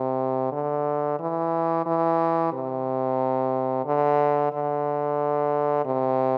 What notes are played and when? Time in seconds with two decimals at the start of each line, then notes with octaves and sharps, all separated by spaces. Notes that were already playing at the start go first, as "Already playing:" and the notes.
Already playing: C3
0.52 D3
1.19 E3
1.86 E3
2.53 C3
3.85 D3
4.53 D3
5.85 C3